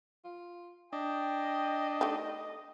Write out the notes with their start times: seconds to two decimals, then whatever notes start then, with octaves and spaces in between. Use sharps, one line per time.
0.24 F4
0.93 D4 D#5 G5
2.01 A3 D#4 G4